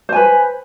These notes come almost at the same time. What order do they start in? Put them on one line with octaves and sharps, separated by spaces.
C5 G#5 B4